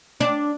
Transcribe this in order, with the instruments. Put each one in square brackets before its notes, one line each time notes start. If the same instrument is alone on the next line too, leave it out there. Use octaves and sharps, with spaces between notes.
[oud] D4